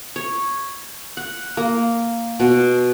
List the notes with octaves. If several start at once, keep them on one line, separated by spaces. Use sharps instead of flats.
C#5
F#5
A#3
B2